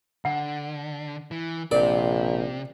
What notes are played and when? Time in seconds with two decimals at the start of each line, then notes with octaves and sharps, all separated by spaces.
0.25 D3 F#5
1.31 E3
1.71 A#1 C3 A#4 D5